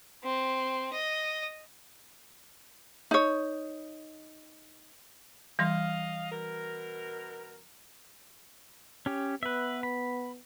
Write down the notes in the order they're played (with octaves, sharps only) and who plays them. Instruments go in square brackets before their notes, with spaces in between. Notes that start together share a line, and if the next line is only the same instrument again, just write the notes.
[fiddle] C4
D#5
[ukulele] D#4 C#5
[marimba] E3 G3 C6 [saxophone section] D#5 F5
[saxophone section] B2 A#4
[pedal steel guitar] C#4 G4
[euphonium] B3 [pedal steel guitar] B4 E5
[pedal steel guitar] B5